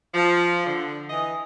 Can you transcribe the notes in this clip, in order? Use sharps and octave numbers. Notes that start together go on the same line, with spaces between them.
F3
D3
E3 D#5